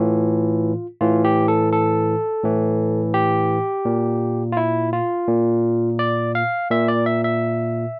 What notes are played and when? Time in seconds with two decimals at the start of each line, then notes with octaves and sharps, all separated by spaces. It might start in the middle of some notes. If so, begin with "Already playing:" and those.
Already playing: A2 E3 F4
1.01 A2 E3 F4
1.25 G4
1.48 A4
1.72 A4
2.44 A2 E3
3.14 G4
3.85 A#2
4.52 F4
4.57 E4
4.93 F4
5.28 A#2
5.99 D5
6.35 F5
6.70 A#2 E5
6.88 D5
7.06 E5
7.24 E5